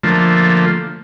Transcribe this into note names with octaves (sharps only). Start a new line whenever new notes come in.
D3 F3 A3 A#3